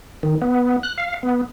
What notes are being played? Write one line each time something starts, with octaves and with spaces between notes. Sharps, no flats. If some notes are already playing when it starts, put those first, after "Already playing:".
D#3
B3
F#6
F5
B3